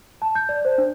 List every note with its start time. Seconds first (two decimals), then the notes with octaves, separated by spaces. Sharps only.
0.22 A5
0.35 G6
0.49 D5
0.65 C5
0.78 D4